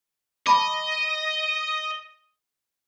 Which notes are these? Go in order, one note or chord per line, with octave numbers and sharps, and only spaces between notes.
D#5 A5 B5 D6